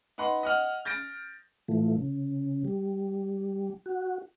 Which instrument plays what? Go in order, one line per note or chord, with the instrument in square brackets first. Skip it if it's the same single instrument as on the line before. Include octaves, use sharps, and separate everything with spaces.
[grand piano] D#4 B4 F#5 B5 C6
D#5 F#5 F6
G6 A6 A#6 D7
[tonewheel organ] A2 E3 F3 A3
C#3
G3
F#4